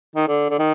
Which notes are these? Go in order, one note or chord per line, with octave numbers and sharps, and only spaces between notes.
D#3
D3
D3
D#3